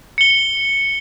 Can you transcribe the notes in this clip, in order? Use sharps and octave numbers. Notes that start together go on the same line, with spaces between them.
C#7 G7